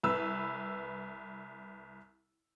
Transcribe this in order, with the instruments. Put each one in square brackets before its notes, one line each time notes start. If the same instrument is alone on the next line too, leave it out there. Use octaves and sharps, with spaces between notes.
[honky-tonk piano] C2 B4 E6